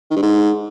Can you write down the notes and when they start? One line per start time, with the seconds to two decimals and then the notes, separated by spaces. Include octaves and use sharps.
0.11 D#3
0.17 G2
0.23 G#2